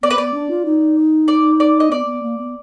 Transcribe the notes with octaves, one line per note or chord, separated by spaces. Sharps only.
B3 D5
B4
B3 D5
D4
F4
D#4
D5
D5
D#5
B3 D5
B3
A#3
B3